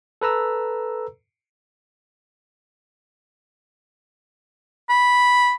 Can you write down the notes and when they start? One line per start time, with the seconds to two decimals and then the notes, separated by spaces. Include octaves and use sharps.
0.21 A4 B4 A#5 E6
4.89 B5